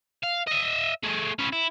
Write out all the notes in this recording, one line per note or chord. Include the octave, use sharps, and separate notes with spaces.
F5
D#5 E5
A3 G#4
C#4 B4
E4